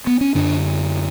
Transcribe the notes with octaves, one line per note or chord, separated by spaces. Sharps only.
B3
C#4
F#2 D3 D4